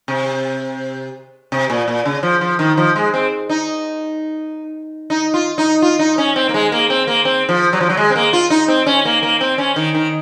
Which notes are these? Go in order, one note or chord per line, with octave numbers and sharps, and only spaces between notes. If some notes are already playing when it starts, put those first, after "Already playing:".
C3
C3
A#2
A#2
C#3
F3
F3
D#3
F3
G#3
C4
D#4
D#4
F4
D#4
F4
D#4
C#4
C4
A#3
G#3
A#3
C4
A#3
C4
F3
F#3
F3
F#3
G#3
C4
A#3
F4
D#4
C4
C#4
A#3
A#3
C4
C#4
D#3
D#3